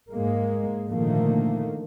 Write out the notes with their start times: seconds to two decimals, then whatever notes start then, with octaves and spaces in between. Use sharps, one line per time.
0.11 G#2 G#3 A#3
0.87 A#2 D3 D#3 F3 A3 A#3